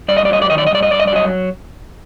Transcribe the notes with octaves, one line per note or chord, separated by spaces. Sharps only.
G2 D5
D#5
D5
F#3 D#5
D5
D#3 D#5
D5
D#5
G2 D5
D#5
G2 D5
D#5
D5
F#3 D#5